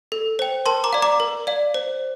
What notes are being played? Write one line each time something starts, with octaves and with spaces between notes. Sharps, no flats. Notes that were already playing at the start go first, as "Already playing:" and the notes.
A4
C5 G5
A#4 A5 C6
A#5 D6
D5 F5
A#5 D6
A#4
D5 F5
C5